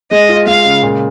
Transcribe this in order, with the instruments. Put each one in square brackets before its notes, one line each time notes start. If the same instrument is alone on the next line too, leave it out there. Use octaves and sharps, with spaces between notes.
[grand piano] G#3 [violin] D#5
[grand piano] F4
[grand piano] G#3 [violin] F5
[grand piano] C#3
A#2